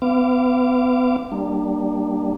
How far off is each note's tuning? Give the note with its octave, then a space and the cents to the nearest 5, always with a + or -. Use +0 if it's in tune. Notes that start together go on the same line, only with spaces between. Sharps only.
B3 +35 F5 -30 D6 +0
G3 -15 A#3 +0 D4 +20